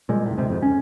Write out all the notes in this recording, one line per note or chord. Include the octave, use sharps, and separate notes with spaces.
A#2 G3 G#3
F1 A2
D2 G#2 C3
F2 G#2
C#4